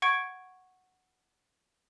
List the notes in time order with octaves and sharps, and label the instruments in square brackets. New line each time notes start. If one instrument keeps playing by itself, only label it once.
[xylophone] F#5 C#6 G#6 D7